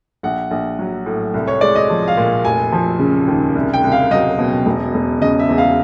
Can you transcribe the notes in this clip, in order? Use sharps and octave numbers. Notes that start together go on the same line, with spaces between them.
A#1 F#5
A#1
F#3
A2
C2
C#5
G#3 D5
D#5
F3
F5
A#2
F1 G#5
F3
C#3
D#2
C2
G5
C2
F5
F#3 D#5
B2
E1
E1
C#3 D#5
E5
E2
F5